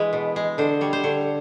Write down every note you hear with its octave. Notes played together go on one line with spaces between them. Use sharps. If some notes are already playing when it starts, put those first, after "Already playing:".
Already playing: E3 G#3 B4
B2
G#3
D3 C5
G3 C#5
C5
D3 C#5